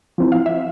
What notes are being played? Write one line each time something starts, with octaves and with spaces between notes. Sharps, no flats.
F3 C4 E4
F5
E5